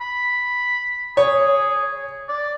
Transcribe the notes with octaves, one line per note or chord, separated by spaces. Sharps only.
B5
G#4 C#5
D5